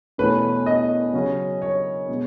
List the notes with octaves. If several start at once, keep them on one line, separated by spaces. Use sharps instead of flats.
E2 B2 A3 C#4 B4
D#5
C#3 F#3 C#4
C#5
B2 G#3